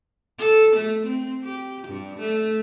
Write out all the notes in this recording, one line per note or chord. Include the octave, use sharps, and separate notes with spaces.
A4
A3
C4
G4
G2
A3